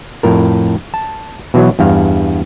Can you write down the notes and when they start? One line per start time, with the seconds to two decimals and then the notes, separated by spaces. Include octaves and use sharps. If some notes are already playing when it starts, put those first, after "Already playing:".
0.23 F2 A2 A#4
0.94 A5
1.54 B2 E3 F#3
1.79 E2 G2 F5